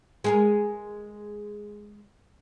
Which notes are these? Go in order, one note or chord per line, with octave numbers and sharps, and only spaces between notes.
G#3 G#4 A#4